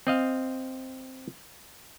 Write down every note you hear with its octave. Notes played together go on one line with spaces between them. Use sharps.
C4 D#5 F5